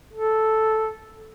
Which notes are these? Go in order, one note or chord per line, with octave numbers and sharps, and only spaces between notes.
A4